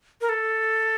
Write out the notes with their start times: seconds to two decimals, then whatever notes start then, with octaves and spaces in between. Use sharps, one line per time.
0.21 A#4
0.29 A4